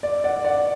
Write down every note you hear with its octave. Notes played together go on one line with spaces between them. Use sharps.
D5
D5 F#5
D5 F#5